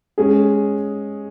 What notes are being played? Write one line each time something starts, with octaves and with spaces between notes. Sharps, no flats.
G#3 C#4 G#4